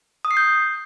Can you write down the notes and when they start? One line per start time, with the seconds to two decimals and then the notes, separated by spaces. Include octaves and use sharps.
0.25 D#6
0.31 C7
0.37 G6